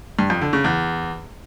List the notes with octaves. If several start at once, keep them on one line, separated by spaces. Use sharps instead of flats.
G2
F2
D3
C#3
E2